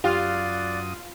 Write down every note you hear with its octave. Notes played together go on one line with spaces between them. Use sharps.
F#2 F4 G4 D5 D#6 F#6